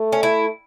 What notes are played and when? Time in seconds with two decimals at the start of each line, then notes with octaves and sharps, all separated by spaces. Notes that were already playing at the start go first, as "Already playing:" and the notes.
Already playing: A3
0.13 C#4
0.23 E4